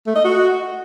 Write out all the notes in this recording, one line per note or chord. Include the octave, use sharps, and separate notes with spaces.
A3
D#5
F#4